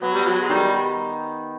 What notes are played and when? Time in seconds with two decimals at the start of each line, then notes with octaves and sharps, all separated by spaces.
0.02 F#3 B3
0.14 G3
0.25 F#3
0.42 G#3
0.49 D#3 G3